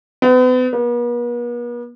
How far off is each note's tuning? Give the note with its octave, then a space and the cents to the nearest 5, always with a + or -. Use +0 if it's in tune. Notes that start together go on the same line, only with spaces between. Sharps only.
B3 +40
B3 -45